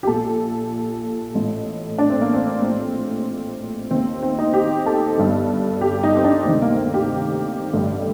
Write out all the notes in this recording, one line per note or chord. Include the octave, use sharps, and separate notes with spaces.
G4
A#1 A#2 A4
A1 A2
D4
C4
A#3
C4
A#1 A2
D#2 D#3 C4
C4
D#4
G4
A4
G1 G2 D3
G4
D#4
C4
D4
D2 C3 D#3 C4
A#3
A#3
G4
A1 G2 D3